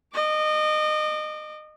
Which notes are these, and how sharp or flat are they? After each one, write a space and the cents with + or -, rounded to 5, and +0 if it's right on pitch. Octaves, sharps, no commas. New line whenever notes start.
D#5 -25 D6 +0